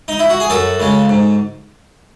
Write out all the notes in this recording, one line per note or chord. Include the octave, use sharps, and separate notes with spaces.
D#4
E4
F#4
G#4
F#2 F#4 A4
C#3 G#3
G#2